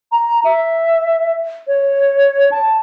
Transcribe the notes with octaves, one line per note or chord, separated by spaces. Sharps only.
A#5
E5
C#5
A5